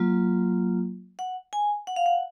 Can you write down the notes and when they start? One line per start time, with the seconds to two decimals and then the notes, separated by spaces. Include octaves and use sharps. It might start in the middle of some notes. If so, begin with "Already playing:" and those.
Already playing: F#3 A#3 F4
1.19 F#5
1.53 G#5
1.87 F#5
1.96 F5
2.06 F#5